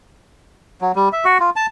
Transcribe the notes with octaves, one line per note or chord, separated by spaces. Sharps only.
F#3
G3
E5
F#4
F4
A5